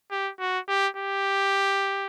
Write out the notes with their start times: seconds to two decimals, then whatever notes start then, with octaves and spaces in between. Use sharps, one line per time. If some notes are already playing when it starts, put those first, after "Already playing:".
0.11 G4
0.39 F#4
0.68 G4
0.96 G4